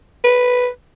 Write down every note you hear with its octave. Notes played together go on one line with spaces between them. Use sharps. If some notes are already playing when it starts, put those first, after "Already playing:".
B4